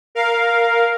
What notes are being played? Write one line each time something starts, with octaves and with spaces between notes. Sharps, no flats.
A#4 F5